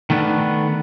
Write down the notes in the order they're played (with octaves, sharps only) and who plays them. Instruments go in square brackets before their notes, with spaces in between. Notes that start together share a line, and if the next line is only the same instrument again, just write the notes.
[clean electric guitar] D#3 A3 B3 D4